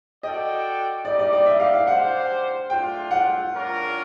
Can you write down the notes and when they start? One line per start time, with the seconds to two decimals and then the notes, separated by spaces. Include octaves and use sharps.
0.23 F#4 A4 D5 D#5 G5
1.05 G3 A#3 D#4 G4 D5
1.19 D5
1.33 D5
1.46 E5
1.60 F5
1.73 F5
1.87 D4 G4 C5 F5 F#5
2.70 A3 D4 F4 G5
3.11 F#5
3.52 D4 F4 A#4 C#5